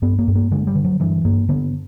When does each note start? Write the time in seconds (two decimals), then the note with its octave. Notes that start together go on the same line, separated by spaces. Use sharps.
0.02 G2 B3
0.19 A#3
0.28 G2
0.35 A#3
0.51 D3 G#3
0.67 G3
0.75 D3
0.85 F#3
1.00 G2 E3
1.25 G2 A#3
1.49 D3 B3